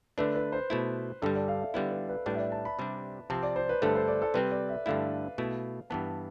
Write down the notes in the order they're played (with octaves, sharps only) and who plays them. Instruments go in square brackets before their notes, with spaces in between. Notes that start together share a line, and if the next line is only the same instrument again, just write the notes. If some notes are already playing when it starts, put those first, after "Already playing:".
[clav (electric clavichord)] D3 A3 D4 [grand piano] B4
[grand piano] B4
C5
[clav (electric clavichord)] B2 A3 E4
[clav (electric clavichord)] G2 D3 G3 [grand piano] A4
[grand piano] D5
F5
E5
[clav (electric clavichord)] D3 G3 B3 E4 [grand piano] D5
[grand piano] B4
B4
[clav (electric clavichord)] A2 G3 D4 [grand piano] B4
[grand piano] E5
D5
A5
B5
[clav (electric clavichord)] C3 G3 D4
[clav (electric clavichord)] C3 F3 C4 [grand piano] A5
[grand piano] D5
C5
B4
[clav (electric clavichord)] G2 D3 A3 [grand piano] A4
[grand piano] C5
D5
A4
[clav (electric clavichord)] C3 G3 C4 [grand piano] B4
[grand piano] D5
E5
[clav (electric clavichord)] G2 D3 A3 E4 [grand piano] F5
[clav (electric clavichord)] B2 A3 E4
[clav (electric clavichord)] G2 E3 B3 [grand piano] A5